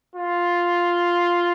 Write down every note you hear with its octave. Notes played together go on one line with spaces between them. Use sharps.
F4